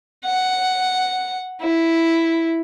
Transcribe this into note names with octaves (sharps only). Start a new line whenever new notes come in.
F#5
E4